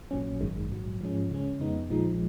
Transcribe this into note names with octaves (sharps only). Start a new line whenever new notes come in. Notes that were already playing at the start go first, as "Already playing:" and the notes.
A#1 A#2 F#3 C#4
G#1 F#2 D#3 G#3
A#1 G#2 F#3
G#2 F3 G#3 C#4
C#2 C#3 G#3 C#4
F2 C#3 G#3 B3 D#4
A#1 A#2 F3 G#3 D#4